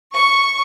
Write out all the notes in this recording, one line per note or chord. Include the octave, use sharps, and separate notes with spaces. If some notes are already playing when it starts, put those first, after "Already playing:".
C#6